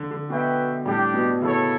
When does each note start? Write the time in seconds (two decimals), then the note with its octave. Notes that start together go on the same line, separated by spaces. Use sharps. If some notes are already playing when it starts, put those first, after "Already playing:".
Already playing: D3
0.11 D3
0.30 B2 F#4 B4 E5 G5
0.85 A2 G3 D4 G4
1.14 B2
1.42 C#3 E4 A4 C#5